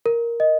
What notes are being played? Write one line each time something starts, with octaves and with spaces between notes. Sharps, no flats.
A#4
D#5